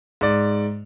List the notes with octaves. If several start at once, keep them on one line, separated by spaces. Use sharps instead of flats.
G#2 D5